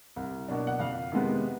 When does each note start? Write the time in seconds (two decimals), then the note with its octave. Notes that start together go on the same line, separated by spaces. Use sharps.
0.16 C2
0.48 B2 F#3 A#3 D4
0.67 F#5
0.79 F2 F5
1.12 C3 D#3 G#3 B3